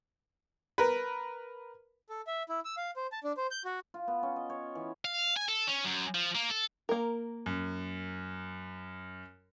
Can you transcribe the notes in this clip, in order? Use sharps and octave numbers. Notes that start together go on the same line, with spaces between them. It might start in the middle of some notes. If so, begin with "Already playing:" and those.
A#4 B4
A4
E5
E4
E6
F5
C5
A5
D4
C5
G6
F#4
F4
B3
C#4
D#5
C#5
E3
F5
G#5
A4
C#4
F#2
F3
A#3
A4
A#3 A#4
F#2